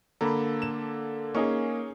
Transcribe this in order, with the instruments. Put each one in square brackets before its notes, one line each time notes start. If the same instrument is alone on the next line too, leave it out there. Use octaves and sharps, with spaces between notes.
[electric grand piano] D3 A#3 A4 [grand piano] A#5 B5
[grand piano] E7
[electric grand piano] A#3 [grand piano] C#4 D#4 G#4